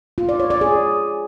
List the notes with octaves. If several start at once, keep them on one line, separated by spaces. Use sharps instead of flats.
F4
D5
C#5
D5
G#4